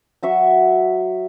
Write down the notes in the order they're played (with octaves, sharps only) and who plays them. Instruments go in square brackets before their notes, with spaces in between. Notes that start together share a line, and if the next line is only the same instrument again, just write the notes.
[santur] F#3 F#4 E5 C#6